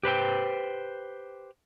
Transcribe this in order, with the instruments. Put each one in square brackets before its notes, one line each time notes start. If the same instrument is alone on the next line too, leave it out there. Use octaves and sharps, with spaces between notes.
[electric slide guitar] G4 B4 C5 G5